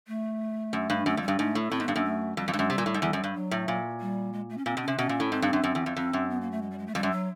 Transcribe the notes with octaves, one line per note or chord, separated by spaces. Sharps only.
A3
F#2
G2
F#2 A3
F2
G3
G2
G#2 A3
A2
A2 C4
G#2 B3
G2
F#2 A#3
A3
F2 G3
F2
G2 G#3
F#2
C3 G3
A#2
A2
G#2
E2 G3
F#2
G2
F#3
A2
A#2
G3
G#3
A3
C#4
A#2 C4
B2
C#4
C3
B2 C#4
A#2
A2
G#2 C4
G2
F#2
F#2
E2
F2
F2 C4
F#2
B3
A#3
A3
G#3
G3
G#3
A3
F2 G3
F#2
F#3